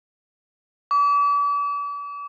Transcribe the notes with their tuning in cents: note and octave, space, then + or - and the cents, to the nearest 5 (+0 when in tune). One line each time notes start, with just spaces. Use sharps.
D6 -40